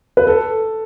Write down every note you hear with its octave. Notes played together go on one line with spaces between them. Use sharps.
B4
A4